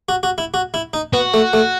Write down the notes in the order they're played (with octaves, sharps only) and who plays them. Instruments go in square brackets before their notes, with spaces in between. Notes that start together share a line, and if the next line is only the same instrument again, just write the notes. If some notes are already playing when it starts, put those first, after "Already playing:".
[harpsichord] F#4
F#4
E4
F#4
E4
D#4
[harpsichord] B3 [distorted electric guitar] F#4
[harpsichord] A3
A3